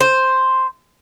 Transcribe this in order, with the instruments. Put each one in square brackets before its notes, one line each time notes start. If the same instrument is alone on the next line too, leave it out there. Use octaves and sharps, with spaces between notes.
[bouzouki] C5